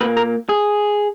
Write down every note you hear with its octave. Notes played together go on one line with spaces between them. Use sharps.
A#2 A#3 B4
A#4
G#4